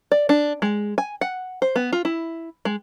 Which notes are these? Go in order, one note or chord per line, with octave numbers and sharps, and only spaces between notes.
D5
D4
G#3
G#5
F#5
C5
B3
F4
E4
G#3